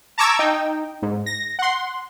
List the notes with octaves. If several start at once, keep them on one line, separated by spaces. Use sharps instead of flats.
A5 A#5 C#6 D6 E6 G#6
D#4 G5
G#2
A#6
F#5 C6